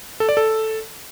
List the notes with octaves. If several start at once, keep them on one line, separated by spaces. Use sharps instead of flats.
A4
D5
A4